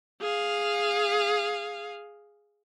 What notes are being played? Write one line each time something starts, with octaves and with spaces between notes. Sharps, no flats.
G#4 F5